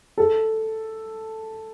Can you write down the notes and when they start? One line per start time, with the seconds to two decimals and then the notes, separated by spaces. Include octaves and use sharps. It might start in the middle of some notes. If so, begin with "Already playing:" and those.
0.18 A4